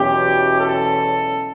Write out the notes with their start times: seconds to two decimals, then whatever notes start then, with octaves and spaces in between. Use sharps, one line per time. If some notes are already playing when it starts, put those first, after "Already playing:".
Already playing: E2 B2 F#3 C#4 G4
0.60 A4